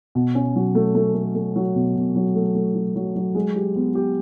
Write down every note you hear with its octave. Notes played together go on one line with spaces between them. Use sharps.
B2
C#4
F#3
A3
A3
A3
A3
F#3
B2
B2
F#3
A3
A3
F#3
F#3
F#3
G#3
G4
B3
G4